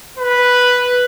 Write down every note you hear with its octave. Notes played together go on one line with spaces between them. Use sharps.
B4